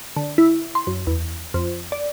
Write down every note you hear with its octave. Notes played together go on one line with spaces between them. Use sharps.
D3
E4
C6
F#2
E2
F2
D5